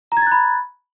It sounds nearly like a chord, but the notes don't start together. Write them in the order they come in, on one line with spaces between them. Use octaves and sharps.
A#5 G#6 A6 F#6 B5